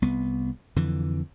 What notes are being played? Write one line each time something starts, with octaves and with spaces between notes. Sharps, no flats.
C2 B3
F2 D3 E3